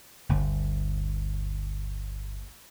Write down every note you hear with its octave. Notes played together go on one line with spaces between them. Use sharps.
G1 D2